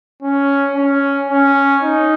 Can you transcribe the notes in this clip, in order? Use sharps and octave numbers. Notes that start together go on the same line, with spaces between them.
C#4
C#4
C#4
D#4